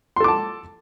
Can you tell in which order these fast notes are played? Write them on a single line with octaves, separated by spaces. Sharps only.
C6 A4 D6 A5